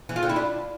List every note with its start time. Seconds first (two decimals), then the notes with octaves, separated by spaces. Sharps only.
0.09 E3
0.16 F4
0.23 D3
0.29 E4
0.36 D4